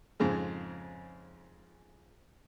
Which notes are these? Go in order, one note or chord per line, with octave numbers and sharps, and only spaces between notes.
F2 G#2 C#3 G#3